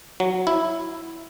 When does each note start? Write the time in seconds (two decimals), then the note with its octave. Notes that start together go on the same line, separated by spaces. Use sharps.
0.20 F#3
0.47 E4